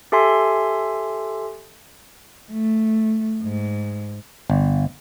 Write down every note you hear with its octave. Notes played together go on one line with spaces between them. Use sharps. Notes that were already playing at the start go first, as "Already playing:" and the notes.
G4 A4 E5 G#5 C6
A3
G#2
G1